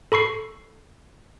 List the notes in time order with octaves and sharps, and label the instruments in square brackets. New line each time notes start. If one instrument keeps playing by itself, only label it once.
[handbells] A4 B5 C#6 C7